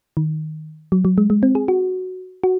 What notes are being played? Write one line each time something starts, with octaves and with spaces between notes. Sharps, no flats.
D#3
F#3
F#3
G#3
G#3
C4
G#4
F#4
F#4